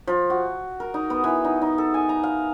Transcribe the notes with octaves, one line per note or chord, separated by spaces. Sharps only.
F3
F#4
A#4
D#4
B3
E3
D#4
D#4
A4
G#5
A#5
F5